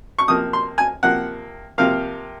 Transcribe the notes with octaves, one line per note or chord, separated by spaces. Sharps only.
C#6
C3 F3 A#3 D#6
C6
G#5
C3 F3 A#3 F#5
C3 F3 A#3 F5